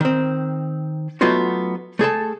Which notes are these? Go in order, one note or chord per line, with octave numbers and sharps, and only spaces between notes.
D#3 C4
F#3 A3 B3 D#4 F4 F#4
A3 G#4 A4 A5